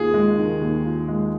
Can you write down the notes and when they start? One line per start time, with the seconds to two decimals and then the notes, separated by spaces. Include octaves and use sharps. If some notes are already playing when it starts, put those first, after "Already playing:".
Already playing: D#2 D#3 F4 G#4
0.14 G#3
0.38 D#3
0.61 D#2
0.85 F4
1.08 G#3